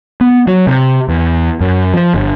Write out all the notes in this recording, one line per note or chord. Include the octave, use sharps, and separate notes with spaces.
B3
F#3
C3
E2
F#2
F3
G1